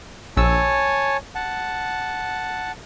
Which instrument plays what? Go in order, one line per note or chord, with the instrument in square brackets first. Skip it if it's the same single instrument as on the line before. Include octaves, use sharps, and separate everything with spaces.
[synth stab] A#1 E6 [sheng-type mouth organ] C#5 G#5 A5
[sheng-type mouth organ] F#5 A5